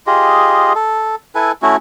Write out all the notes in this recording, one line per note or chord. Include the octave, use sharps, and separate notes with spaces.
F4 G4 G#4 D#5
A4
E4 A4 B4 G#5
A3 C#4 E4 F#4